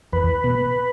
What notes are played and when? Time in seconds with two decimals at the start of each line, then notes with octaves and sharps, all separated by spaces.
0.13 E2 B4
0.44 B2